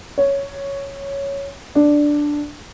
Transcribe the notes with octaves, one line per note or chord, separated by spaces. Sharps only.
C#5
D4